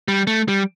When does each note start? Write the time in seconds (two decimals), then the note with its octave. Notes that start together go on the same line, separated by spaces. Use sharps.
0.08 G3
0.27 A3
0.48 G3